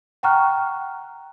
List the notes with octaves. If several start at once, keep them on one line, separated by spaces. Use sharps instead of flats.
F#5 G5 A#5 C#6 F6 F#6